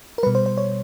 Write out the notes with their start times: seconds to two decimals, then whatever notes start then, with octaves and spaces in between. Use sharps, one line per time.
0.18 A#4
0.23 G3 B4
0.27 B2
0.35 C5
0.46 C5
0.57 C#5